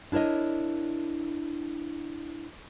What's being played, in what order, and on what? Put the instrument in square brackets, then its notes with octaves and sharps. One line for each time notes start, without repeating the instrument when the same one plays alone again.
[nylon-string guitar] D4 E4 A#4 C#5 D#5